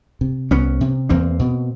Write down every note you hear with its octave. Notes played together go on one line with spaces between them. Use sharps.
C3
C2 B3 C#4
C3
E2 A#3 C4
B2